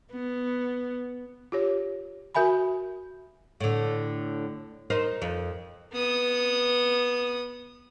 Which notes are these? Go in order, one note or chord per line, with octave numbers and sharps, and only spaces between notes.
B3
F4 G4 C#5
F#4 A#4 E5 G#5 B5
A2 D3
D#4 A#4 C5
F2
B3 D#6